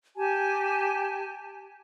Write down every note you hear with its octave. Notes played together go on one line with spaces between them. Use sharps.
G4 G#5 A5